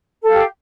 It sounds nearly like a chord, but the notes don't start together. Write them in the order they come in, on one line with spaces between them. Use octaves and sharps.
A4 F5 G4